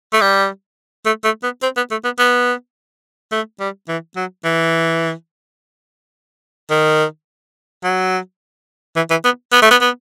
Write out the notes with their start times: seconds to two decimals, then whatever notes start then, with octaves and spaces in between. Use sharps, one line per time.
0.13 A3
0.21 G3
1.06 A3
1.24 A3
1.43 B3
1.63 C4
1.76 B3
1.91 A3
2.04 B3
2.19 B3
3.32 A3
3.60 G3
3.88 E3
4.16 F#3
4.44 E3
6.70 D#3
7.84 F#3
8.96 E3
9.10 E3
9.25 B3
9.52 B3
9.62 A3
9.71 B3
9.81 B3